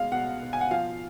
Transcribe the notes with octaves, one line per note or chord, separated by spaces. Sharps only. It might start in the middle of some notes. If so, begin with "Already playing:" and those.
Already playing: B2 G#3 F5
B2 F#5
B2
G#5
F#5
F3 F5